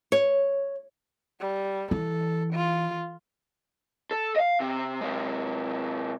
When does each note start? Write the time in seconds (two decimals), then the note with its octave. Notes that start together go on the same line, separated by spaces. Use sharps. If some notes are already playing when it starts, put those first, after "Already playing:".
0.12 C#5
1.40 G3
1.91 E3 A4
2.53 F4
4.11 A4
4.36 D#5 F5
4.60 C3
5.01 C3 G#3